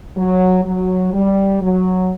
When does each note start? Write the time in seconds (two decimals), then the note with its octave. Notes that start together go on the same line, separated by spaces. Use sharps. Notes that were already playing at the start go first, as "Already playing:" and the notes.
0.17 F#3
0.65 F#3
1.13 G3
1.61 F#3